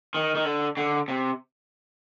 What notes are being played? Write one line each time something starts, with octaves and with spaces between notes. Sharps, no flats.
D#3
D#3
D3
D3
C3